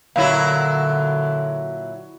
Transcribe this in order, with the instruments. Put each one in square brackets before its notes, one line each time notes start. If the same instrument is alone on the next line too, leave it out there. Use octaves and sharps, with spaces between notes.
[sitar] A#2 F#3 E4 [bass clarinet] D3 [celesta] F5